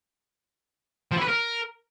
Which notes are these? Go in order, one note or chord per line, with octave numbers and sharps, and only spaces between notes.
F3
E4
B4
A#4